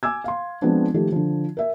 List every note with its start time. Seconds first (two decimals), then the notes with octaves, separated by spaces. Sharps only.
0.03 G#5 D6 E6 G#6
0.24 F5 C6
0.62 F3 G#3 B3 C4 D4
0.94 D#3 F3 A3 G4
1.12 D3 F3
1.57 A#4 E5